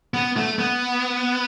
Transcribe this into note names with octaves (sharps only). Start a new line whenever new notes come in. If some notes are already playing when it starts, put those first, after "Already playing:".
B3
A3
B3